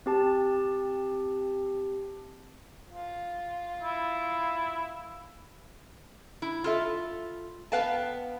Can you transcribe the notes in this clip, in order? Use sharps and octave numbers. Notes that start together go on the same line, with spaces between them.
C4 G4 A5
F4
E4
E4
F4 A4 E5
B3 B4 F5 G5 A5